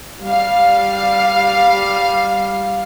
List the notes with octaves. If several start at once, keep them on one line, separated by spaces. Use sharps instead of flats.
G3 F5